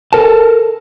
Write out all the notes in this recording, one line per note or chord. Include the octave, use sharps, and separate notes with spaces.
A4 A#4 A5